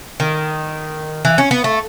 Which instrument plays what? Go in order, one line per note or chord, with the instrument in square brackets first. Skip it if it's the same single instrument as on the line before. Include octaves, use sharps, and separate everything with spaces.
[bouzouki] D#3
E3
C#4
B3
A3